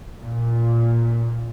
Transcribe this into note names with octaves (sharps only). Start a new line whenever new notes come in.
A#2